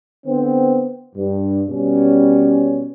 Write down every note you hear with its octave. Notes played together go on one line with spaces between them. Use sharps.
D3 B3 C4
G2
B2 G3 C#4